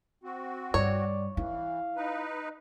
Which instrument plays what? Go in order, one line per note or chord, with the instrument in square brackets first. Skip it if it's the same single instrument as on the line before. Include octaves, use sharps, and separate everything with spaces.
[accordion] C4 F#4
[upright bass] G2 [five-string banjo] C#5 [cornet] D5
[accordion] E3 [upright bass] E4 [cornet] F5
[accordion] D#4 B4